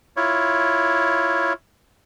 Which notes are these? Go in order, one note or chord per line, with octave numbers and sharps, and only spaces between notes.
E4 F4 C#5